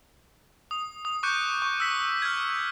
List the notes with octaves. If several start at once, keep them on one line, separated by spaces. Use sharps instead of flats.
D#6
D#6
C#6 D6 F#6 G6 C#7
C#6
E6 B6
F6 G#6